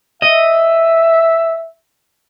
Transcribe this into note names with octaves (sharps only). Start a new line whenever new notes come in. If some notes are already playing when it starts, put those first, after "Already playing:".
D#5 E5